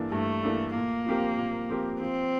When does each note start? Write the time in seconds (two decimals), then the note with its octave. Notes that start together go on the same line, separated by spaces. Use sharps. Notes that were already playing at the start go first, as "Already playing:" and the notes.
Already playing: G2 E3 A#3 D4 A4
0.12 G2 A3
0.43 E3 A#3 D4 A4
0.75 A#2 A#3
1.06 F3 C4 G4 A#4
1.38 A#2
1.69 F3 C4 G4 A#4
2.01 F3 C4